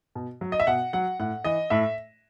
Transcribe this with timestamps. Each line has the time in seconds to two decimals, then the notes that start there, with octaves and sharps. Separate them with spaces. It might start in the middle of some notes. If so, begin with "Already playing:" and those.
0.15 B2
0.41 F#3
0.52 D#5
0.60 E5
0.67 B2 F#5
0.93 F#3 F#5
1.20 A2 F#5
1.44 E3 D#5
1.70 A2 E5